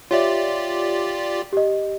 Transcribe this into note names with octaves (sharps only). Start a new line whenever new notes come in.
F4 G4 C#5 D5 E5
G4 D#5